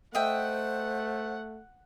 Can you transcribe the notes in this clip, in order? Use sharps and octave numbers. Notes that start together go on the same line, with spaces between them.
A3 C5 D#5 E5 F#5 G5